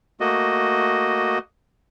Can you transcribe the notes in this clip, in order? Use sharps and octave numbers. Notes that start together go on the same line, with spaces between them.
A3 A#3 F#4 D#5